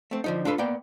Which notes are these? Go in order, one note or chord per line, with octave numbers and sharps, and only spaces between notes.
A3 C4
D3 F3 D#4
D4 F4 A4 B4
A#3 B3 D5 G5